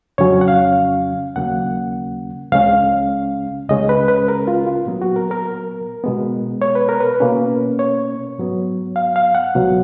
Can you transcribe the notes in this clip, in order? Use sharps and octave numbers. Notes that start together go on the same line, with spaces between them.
F2 C#3 F#3 C#4 C#5
F#5
F5
D#2 C#3 F#3 A#3 C#4 F#5
C#2 C#3 G#3 C#4 F5
C#2 C#3 G#3 C#4 D#5
B4
B4
A#4
F4
F4
A#2 F#3 B3
F#4
A#4
A#4
B2 G#3 B3
C#5
B4
A#4
B4
B2 A#3 C#4
C#5
G#2 F#3 B3
F5
F5
F#5
C#2 B2 F#3